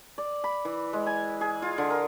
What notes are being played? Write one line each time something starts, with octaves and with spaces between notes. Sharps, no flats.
D5
B5
E3
G#3
G#5
G#4
F4
D3
A#4